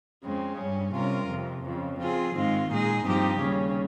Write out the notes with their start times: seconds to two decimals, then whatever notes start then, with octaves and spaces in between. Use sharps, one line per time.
0.24 F2 C#3 G#3 C4
0.59 G2 G3 C#4
0.94 C3 G3 C#4 F4 A#4
1.29 F2 C3 F3
1.64 F2 C#3 F3
1.99 F3 C4 F4 G#4
2.34 G#2 D#3 G#3 C4 F4
2.70 A#2 G#3 D#4 G#4
3.04 G2 F3 C4 D#4 G4
3.40 D#2 C#3 G3 C#4